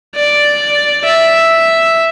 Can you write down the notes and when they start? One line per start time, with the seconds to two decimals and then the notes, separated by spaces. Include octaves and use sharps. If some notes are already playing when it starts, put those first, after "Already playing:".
0.16 D5
1.05 E5